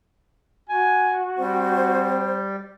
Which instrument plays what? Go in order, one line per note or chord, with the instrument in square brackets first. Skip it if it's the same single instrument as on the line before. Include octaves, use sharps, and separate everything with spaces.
[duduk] F#4 [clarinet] G#5
[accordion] G3 [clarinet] C4 [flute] C5